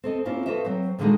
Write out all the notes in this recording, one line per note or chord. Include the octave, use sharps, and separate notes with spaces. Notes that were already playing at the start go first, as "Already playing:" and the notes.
C4 A4 D#5
A#3 C4 C#4 E4 F4
F#4 A4 B4 C5 D#5 E5
F#3 C4 C5
A#2 D3 D#3 G#3 D#4 F#4